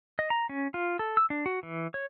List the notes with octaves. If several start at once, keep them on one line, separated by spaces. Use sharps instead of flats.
D#5
A#5
C#4
F4
A4
E6
D4
F#4
E3
C#5